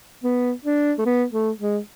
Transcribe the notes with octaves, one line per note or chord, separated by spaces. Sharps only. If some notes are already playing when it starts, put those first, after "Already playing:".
B3
D4
A3
B3
A3
G#3